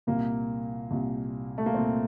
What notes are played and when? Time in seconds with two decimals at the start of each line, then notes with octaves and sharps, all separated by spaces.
0.07 C2 A#2 A#3
0.91 C2 A#2
1.58 A3
1.66 A#3
1.74 C2 A#2 C4